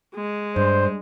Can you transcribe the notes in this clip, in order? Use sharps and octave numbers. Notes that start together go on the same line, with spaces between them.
G#3
G2 C5